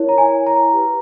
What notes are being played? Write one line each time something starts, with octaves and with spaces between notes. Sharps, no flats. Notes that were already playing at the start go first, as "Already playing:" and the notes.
Already playing: E4 A#4 C#5
A#5
G#5
A#5
G4 B4